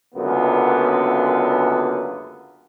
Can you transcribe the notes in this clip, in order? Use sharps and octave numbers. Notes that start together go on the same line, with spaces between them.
C#2 F#2 D3 A#3 B3